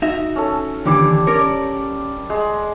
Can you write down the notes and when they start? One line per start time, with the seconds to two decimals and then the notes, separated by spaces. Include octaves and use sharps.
0.02 D#4 F#4 E5
0.36 C#4 A4
0.86 D#2 D3 E3 G3 D6
1.27 C#4 A#4 C#5 D5
2.30 G#3